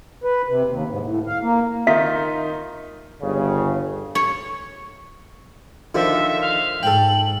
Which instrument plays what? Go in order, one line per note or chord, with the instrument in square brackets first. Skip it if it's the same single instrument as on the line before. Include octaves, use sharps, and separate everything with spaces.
[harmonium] B4
C3
D#2
G#2
A2
F5
A#3
[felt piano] D#3 D#4 F4 [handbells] E5 B6
[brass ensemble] G1 C#3
[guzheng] C#5
[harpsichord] D3 D#3 F3 [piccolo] E5
[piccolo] F5
[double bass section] G#2 [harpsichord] A4 G5 [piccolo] F#7